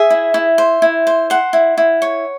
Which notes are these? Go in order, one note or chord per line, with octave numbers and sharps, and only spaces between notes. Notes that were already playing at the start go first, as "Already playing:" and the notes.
Already playing: G#4 E5
E4
E4
C5
E4
C5
C5 F#5
E4
E4
C#5